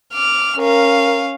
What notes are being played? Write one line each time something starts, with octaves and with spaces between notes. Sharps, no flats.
D6 F6
C#4 A#4 F5